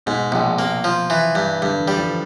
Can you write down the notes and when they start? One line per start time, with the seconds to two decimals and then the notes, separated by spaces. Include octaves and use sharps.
0.06 G#2 B2
0.32 A#1 C3
0.59 C3 A#3
0.84 F3
1.10 E3
1.35 G2
1.62 G2 D3
1.79 E3
1.88 G3
1.96 F3